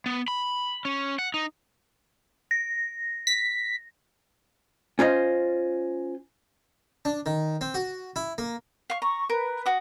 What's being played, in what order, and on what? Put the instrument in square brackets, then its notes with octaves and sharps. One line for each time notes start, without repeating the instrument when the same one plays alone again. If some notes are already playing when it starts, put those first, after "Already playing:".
[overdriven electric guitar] B3
B5
C#4
F#5
D#4
[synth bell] A#6
[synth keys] B6
[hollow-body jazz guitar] C#4 F4 C5 D#5
[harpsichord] D4
D#3
C4
F#4
E4
A#3
[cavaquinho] F5 C#6
[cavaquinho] A#5 [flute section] C#6
[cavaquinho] A#4 [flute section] B4
[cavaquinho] F#4 D#6